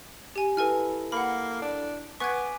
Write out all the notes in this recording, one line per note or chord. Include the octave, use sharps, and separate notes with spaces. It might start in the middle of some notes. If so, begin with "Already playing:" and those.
G4 G#5
E4 A4 B4 G#5 F6
A#3 F#5 B5
D4
B3 G#5 C#6 D6 F#6 G#6 B6